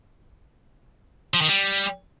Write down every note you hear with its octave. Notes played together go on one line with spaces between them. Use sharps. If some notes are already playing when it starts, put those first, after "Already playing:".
F3
D#3
G3